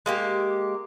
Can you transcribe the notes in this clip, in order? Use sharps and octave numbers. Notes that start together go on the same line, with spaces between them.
G#3 A#3 G4